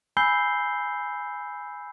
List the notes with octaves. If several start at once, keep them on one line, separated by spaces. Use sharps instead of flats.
G#5 B5 E6 G6 C7 G7